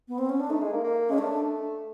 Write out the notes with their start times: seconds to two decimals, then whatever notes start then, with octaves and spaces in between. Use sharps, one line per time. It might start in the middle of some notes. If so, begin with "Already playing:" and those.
0.08 B3
0.18 C4
0.29 C#4
0.40 D4
0.50 A3 D#4
0.61 G#3
0.73 A#3
0.84 A#3
1.09 G#3 C#4
1.18 A3 D4